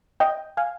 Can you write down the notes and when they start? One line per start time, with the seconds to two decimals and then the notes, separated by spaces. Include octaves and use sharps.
0.20 D#5 G5
0.57 F5 G#5